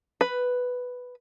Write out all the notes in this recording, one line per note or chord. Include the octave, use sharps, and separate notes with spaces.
B4